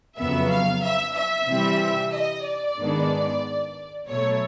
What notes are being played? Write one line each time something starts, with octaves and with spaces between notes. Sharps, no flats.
F2 C#3 F#3 B3 E5
F5
E5
E5
C3 E3 G3 C4
D#5
D5
G#2 D#3 G#3 B3 D4
B2 F#3 A3 C#5